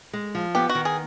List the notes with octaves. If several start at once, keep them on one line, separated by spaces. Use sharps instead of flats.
G#3
F3
B3 G4
F#4
D#3
G#4